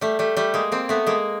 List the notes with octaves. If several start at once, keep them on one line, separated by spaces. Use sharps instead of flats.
G3 A3
G3 A3
G3 A3
G#3 A#3
A#3 C4
A3 B3
G#3 A#3